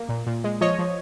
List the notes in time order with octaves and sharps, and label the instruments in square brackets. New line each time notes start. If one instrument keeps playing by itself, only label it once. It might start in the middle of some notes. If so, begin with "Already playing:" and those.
Already playing: [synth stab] A#3
A#2
A#2
G#3
F3 C#5 D#5
F3